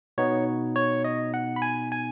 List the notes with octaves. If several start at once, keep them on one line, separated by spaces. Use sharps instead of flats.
B2 B3 D#4 C#5
C#5
D#5
F#5
B5
G#5
G#5